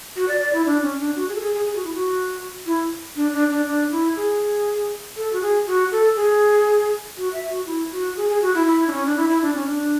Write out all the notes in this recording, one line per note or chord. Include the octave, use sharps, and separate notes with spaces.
F#4
D5
D5
E4
D4
C#4
D4
F#4
G#4
A4
G#4
G#4
G#4
F#4
E4
F#4
E4
D4
D4
D4
D4
E4
G#4
A4
F#4
G#4
F#4
A4
G#4
F#4
E5
F#4
E4
F#4
G#4
G#4
F#4
E4
E4
D4
C#4
D4
E4
E4
D4
C#4
D4